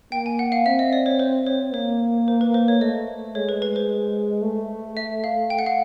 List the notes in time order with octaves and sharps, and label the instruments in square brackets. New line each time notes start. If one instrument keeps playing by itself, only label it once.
[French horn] A#3 [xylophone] G5
[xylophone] G#5
F#5
F5
[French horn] C4 [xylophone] E5
[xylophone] D#5
D5
C#5
C5
C#5
[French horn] A#3 [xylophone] C#5
[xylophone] C5
B4
C5
C#5
[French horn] A3 [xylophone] D#5
[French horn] G#3 [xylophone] C#5
[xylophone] B4
B4
C5
[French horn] A3
[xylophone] E5
F5
G5
F#5
F5